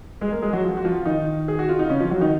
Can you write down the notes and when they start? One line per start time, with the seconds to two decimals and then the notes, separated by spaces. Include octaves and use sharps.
0.21 G#3 G#4
0.32 A#3 A#4
0.42 G#3 G#4
0.53 F#3 F#4
0.63 F3 F4
0.77 F#4
0.85 F3 F4
1.05 D#3 D#4
1.48 G#4
1.59 F#4
1.69 F4
1.79 D#4
1.89 C#3 C#4
2.00 F3 F4
2.10 F#3 F#4
2.21 D#3 D#4